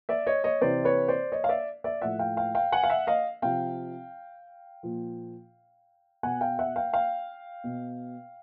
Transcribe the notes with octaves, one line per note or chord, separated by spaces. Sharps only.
D5 E5
C#5 D#5
C#5 D#5
C3 E3 C5 D5
B4 C#5
C5 D5
C#5 D#5
F5
D5 E5
D5 E5
A2 F3 E5 F#5
F5 G5
F5 G5
F5 G5
F#5 G#5
F5
E5 F#5
D#5 F5
C3 F3 F5 G5
A#2 F3
B2 F#5 G#5
F5 G5
E5 F#5
F5 G5
F5 G5
B2